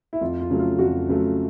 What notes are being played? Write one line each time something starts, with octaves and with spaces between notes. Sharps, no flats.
E4
F2 F4
F4
C#3 F#3 A3
F4
F2 F#4
C#3 F#3 A3